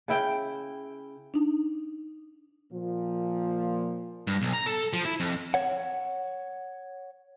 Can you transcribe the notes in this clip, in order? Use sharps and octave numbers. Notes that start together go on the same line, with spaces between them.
C#3 E4 G5
D4 D#4
A#2 F3
G2
B1
A#5
A4
F3
E4
F2
C#5 F#5